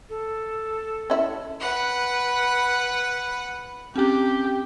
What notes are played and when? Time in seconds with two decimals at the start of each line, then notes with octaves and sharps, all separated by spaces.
0.09 A4
1.10 C#4 E4
1.60 B4 F#5
3.96 C4 C#4 G4